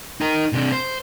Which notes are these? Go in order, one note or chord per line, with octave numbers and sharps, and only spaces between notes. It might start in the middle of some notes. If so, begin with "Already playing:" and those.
D#4 A#4
C3 D4
C5